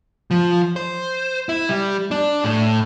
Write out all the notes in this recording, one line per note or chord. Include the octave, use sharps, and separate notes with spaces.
F3
C5
E4
G3
D4
A2